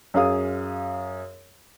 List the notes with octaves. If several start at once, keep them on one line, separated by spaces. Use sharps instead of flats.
F#2 G#4 F5 D#6